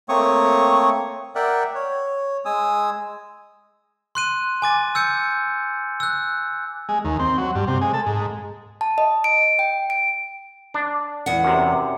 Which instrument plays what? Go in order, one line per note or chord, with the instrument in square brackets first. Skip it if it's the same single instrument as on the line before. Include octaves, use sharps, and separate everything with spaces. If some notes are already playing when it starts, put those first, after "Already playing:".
[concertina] A3 A#3 C4 C#5 C#6 D#6
A#4 D5 E5 F#5 G5
C#5
G#3 G#5 D#6 E6
[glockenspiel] C6 F#6 D#7
G#5 D6 A6
E6 G6 C#7
E6 F#6
[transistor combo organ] G#3
D#2
C4
F#3
G2
C3
G#3
A4
G#2
[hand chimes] A5
D#5
D7
G5
D7
[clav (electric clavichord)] D4
[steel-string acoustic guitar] E2 F#5
[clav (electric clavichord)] F#2 C3